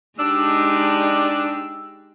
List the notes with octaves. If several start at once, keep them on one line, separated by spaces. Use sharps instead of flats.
G#3 D4 D#4 G4 E6